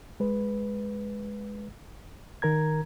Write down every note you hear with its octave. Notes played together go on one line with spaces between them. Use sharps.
G#3 B4
D#3 A#4 A#5 G#6